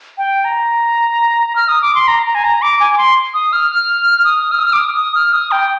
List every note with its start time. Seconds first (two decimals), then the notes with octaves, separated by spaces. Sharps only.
0.18 G5
0.45 A#5
1.56 F6
1.68 D#6
1.82 D6
1.95 C6
2.08 A#5
2.26 A#5
2.35 G#5
2.44 A#5
2.62 D6
2.80 G#5
2.93 D6
2.98 C6
3.34 D#6
3.53 F6
3.71 F6
4.25 D#6
4.52 F6
4.59 D#6
4.66 F6
4.73 D6
4.79 D#6
4.97 D#6
5.15 F6
5.33 D#6
5.52 G5